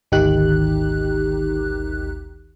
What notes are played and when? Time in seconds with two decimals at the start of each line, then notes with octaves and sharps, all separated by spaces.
0.12 G#1 D2 D#3 D#4 G4 F#6